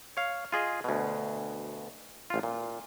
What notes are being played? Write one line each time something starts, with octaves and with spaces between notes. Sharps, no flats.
C#5 F5
F4 G#4 D#5
D2 B2
A1 F4
A#2